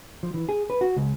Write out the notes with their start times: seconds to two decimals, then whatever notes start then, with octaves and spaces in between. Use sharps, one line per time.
0.23 F3
0.34 E3
0.49 G#4
0.70 B4
0.81 F#4
0.97 C#2